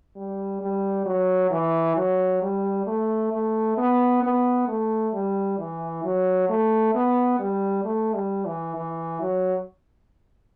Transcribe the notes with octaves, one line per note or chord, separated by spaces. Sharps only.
G3
G3
F#3
E3
F#3
G3
A3
A3
B3
B3
A3
G3
E3
F#3
A3
B3
G3
A3
G3
E3
E3
F#3